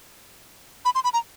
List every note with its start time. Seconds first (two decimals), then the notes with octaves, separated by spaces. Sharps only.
0.85 B5
0.95 C6
1.04 B5
1.13 A#5